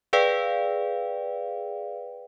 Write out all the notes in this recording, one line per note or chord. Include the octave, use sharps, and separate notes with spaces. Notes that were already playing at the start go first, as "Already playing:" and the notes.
G#4 B4 D5 F5 G5